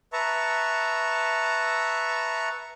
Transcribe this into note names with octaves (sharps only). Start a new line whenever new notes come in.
B4 E5 A5 A#5 C#6